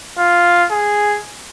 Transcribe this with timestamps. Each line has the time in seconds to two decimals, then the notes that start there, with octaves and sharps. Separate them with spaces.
0.18 F4
0.71 G#4